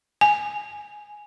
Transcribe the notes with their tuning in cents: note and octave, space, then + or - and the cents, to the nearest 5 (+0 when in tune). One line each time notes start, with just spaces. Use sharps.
G#5 +0